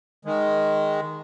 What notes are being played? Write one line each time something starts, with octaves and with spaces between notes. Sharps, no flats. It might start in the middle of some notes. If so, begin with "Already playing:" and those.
D#3 G#3